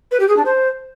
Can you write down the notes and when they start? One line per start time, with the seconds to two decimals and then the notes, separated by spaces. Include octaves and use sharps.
0.11 B4
0.20 G4
0.28 G#4
0.37 D4
0.45 C5